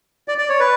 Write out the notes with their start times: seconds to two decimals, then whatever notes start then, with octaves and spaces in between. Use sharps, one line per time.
0.28 D5
0.38 D5
0.49 C#5
0.60 B4